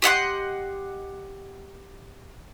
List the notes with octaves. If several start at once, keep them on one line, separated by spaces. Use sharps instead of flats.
G4 D#5 F#5 C6